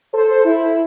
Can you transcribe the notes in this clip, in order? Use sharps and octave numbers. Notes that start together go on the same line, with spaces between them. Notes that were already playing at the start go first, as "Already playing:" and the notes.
A4 C5
E4